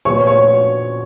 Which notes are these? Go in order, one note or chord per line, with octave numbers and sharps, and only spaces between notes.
A#2 F3 B3 F#4 C#5 C#6
C#5 C#6